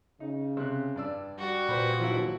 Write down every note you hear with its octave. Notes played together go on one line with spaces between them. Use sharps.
C#3 D#4
C3 F#6
G2 D5 E6
G3 F#4
A#2 B4 C5 B5
D#2 F3 F#3 E4